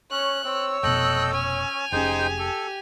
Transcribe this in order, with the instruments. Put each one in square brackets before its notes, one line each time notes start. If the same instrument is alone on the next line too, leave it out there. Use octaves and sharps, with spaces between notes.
[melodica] C#4 [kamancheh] C#5 [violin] F#6
[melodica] C4 [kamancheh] C#5 E6
[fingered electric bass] F1 B2 [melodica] A4 D#5 G5 [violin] F#6
[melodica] C#4 [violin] G#5 F7
[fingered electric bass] F1 C#4 [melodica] D#4 C5 G5 [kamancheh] G4 G#4
[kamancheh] G4 [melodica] A4